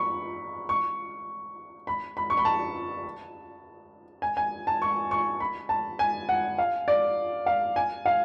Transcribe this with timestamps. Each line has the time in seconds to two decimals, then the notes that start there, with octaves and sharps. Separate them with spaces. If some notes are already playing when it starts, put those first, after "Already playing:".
Already playing: B5 C#6
0.69 C#6
1.87 B5
2.17 B5
2.30 C#6
2.38 B5
2.45 A5
4.22 G#5
4.37 G#5
4.67 A5
4.82 C#6
5.11 C#6
5.40 B5
5.69 A5
5.99 G#5
6.29 F#5
6.58 F5
6.88 D5
7.46 F5
7.76 G#5
8.06 F5